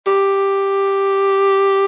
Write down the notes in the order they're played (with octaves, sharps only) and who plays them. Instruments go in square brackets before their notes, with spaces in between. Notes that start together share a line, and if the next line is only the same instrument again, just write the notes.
[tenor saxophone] G4